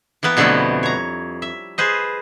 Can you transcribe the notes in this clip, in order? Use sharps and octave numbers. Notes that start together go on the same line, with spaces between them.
E3 A#3 B3 B4
F2 B2 D3 G3 A3 E4
C#5 A#5
E5
G#4 B4 C5 D#5